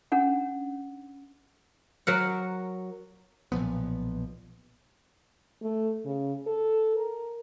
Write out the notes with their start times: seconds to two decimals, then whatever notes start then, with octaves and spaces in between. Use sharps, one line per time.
0.12 C#4 D4 F#5
2.07 F#3 A#4 F#5
3.52 B1 A#2 F3 B3
5.63 A3
6.05 C#3
6.47 A4
6.96 A#4